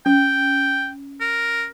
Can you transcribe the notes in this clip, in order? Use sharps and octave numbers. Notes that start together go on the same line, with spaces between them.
C#4 G5
A#4